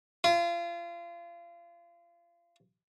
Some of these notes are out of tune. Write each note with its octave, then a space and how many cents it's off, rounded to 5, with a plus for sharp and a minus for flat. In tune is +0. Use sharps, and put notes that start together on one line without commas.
F4 -30